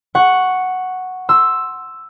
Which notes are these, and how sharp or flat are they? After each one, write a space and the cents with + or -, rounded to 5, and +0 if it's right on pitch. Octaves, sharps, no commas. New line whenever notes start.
F#5 +0 C#6 +0
C6 +10 E6 +0